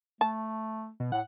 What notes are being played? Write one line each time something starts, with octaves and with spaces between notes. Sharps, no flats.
A3 A5
B2
A2 F#5